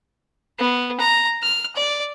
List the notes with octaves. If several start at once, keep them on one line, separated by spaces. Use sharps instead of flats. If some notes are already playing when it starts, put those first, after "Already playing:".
B3
A#5
F6
D5